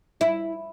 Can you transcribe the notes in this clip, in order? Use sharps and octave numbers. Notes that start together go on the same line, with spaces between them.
E4